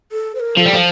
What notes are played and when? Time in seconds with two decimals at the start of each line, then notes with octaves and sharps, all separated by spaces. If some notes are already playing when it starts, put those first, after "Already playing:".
0.12 A4
0.35 C5
0.40 A#4
0.57 F3 A4
0.66 G3
0.74 F3